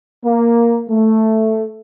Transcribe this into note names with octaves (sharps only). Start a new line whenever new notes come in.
A#3
A3